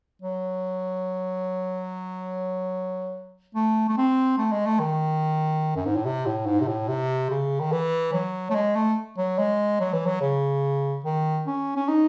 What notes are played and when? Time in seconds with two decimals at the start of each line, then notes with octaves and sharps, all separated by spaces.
0.22 F#3
3.55 A3
3.89 A3
3.98 C4
4.38 A3
4.52 G#3
4.66 A3
4.80 D#3
5.76 F#2
5.86 G#2
5.96 A2
6.05 C3
6.26 A2
6.46 G#2
6.61 C3
6.68 A2
6.88 C3
7.30 C#3
7.60 D#3
7.72 E3
8.13 F#3
8.50 A3
8.55 G#3
8.76 A3
9.18 F#3
9.39 G#3
9.80 F#3
9.93 E3
10.06 F#3
10.21 C#3
11.05 D#3
11.47 C#4
11.77 C#4
11.88 D#4